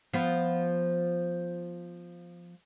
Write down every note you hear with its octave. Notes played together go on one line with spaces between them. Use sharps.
F3 B3